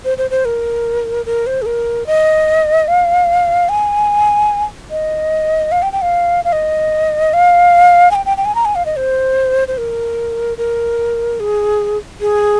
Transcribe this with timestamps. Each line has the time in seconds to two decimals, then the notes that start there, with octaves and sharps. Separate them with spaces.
0.04 C5
0.18 C5
0.30 C5
0.45 A#4
1.26 A#4
1.46 C5
1.62 G#4
1.66 A#4
2.06 D#5
2.88 F5
3.69 G#5
4.91 D#5
5.72 F5
5.82 G5
5.92 G5
6.02 F5
6.44 F5
6.52 D#5
7.33 F5
8.11 G#5
8.15 G5
8.25 G5
8.37 G5
8.45 G#5
8.55 A#5
8.65 G#5
8.75 F5
8.85 D#5
8.96 C5
9.68 C5
9.77 A#4
10.58 A#4
11.40 G#4
12.21 G#4